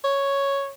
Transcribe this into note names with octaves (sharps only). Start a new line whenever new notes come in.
C#5